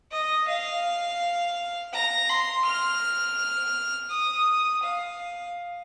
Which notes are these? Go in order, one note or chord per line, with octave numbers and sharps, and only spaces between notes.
D#5
F5
A#5
C6
F6
D#6
F5